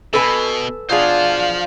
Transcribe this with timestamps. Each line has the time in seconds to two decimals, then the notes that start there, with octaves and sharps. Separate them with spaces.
0.13 B2 A4 B4 G#5
0.89 B2 D4 F4 G#4 C5 F5